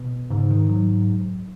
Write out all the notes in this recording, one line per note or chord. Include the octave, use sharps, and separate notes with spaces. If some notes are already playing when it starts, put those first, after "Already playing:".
Already playing: B2
G#2 C#3
D#3
F#3